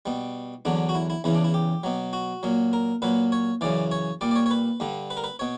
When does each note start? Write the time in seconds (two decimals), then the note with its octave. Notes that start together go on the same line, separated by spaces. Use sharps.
0.06 B2 G3
0.65 E2 D3 F#3 D4
0.89 F#4
0.95 E4
1.10 E4
1.24 E2 C#3 E3 E4
1.35 D4
1.44 E4
1.54 G4
1.83 B2 F#3
2.13 F#4
2.43 A#2 F#3
2.73 A#4
3.02 A#2 F#3 B4
3.32 C#5
3.61 F#2 C#3 E3 D5
3.91 C#5
4.21 A#2 G3 D5
4.31 D5
4.36 C#5
4.46 C#5
4.51 B4
4.80 G2 D3 G3
5.10 B4
5.17 A#4
5.24 B4
5.39 B2 C#5